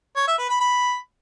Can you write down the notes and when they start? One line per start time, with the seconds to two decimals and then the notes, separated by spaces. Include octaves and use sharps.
0.16 C#5
0.27 E5
0.39 B4
0.50 B5
0.61 B5